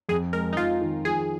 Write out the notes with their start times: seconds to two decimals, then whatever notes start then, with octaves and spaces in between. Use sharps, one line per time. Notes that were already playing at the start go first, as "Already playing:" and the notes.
0.09 F2 G#4
0.33 G#3 A#4
0.53 D#4
0.57 F2 F4
0.81 D#3
1.05 F3 G#4